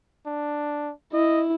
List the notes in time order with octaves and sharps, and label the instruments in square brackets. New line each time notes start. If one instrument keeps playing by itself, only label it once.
[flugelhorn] D4
[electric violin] E4 [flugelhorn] D#5